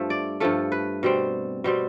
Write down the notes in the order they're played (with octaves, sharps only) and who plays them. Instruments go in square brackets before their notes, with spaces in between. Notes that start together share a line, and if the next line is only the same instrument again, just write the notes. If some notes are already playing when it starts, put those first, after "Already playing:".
Already playing: [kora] G2 F3 A3 E5
D5
G2 F3 A3 A4
B4
B2 G3 C4
B2 G3 C4